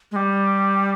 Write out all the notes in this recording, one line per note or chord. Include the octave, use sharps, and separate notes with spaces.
G#3
G3